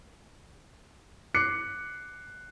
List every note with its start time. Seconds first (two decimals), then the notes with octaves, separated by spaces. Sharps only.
1.34 D6 F#6 C7 C#7